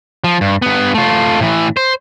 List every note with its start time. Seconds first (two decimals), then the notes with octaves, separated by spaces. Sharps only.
0.24 F3
0.41 G2
0.62 G2 B3
0.94 A3 F4
1.40 A2 E3
1.77 C5